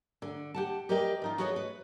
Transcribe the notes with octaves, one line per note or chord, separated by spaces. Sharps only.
D3
G4 F#5 A5
G4 A#4 B4 D5 D#5 G5
F3 D#4 F4
F#4 G#4 A4 B4 C#5 D#5
B4